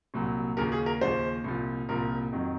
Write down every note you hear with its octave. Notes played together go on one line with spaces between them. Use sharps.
C2 A#2 F#3
D#2 C#3 F3 A#4
G#4
A#4
D#2 C#3 F3 C5
C2 A#2 F3
C2 A#2 F3 A#4
F2 D#3 F#3